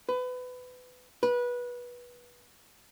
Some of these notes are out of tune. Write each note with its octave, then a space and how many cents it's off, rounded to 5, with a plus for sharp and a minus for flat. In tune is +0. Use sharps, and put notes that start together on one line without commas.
B4 +25
B4 -20